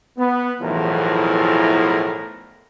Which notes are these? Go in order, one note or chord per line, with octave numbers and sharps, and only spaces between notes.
B3
B1 E2 A2 E3 F3 A#4